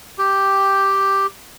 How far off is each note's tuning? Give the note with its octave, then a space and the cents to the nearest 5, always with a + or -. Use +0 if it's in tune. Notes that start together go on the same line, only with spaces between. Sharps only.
G4 +0 G5 +0